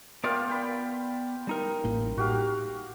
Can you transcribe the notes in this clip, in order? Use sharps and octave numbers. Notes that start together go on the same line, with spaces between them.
B3 F4 A#4 D5 F5 G5
G5 B5
G3 D#4 A#4
A1 A2 A#3
A2 F#4 G4 F5